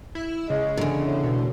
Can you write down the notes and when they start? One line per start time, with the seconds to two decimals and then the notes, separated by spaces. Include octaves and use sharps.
0.15 E4
0.50 C#3 G#3
0.77 E2 D3
1.04 A2
1.23 B2